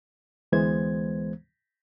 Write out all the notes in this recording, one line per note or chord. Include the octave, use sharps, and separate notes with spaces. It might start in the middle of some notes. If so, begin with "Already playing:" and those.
D2 E3 G#3 B3 C5 G#6